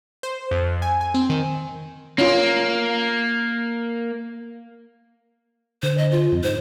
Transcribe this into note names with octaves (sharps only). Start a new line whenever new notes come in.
C5
F2
G#5
G#5
C4
D#3
A#3 C#4 F4
D3 C5
D#5
F4
F2
G#2 C5